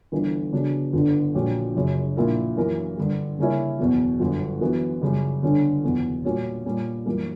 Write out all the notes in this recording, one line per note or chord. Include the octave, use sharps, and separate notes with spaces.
G1 G2 E3
C#3 F#3 B3 D4
G1 G2 D3 G3
A#1 A#2 F#3 C#4 G4
F#1 F#2 C#3
A#1 A#2 A#3 E4 A#4
F#2 E3 A#3 E4 A#4
G2 D3 G3
C#3 G3 A#3 C#4 E4
F#1 E2 B2
G1 F#2 D3
F#2 E3 B3 F#4
F#2 C#3 G3
G1 G2 D3 G3 C#4
F#1 E2 B2
A#2 G3 C#4 F#4
A#2 G3 C#4
F#2 E3 G3 A#3